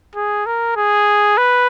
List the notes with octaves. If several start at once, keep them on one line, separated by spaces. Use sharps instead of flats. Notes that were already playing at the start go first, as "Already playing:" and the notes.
G#4
A#4
G#4
B4